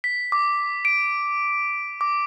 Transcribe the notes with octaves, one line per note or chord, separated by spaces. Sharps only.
B6
D6
D7
D6